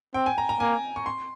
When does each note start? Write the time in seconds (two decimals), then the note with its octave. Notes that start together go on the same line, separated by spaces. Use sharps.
0.14 C4 G5
0.26 G#5
0.38 A#5
0.49 A#5
0.60 A#3 G#5
0.96 C#6
1.06 C6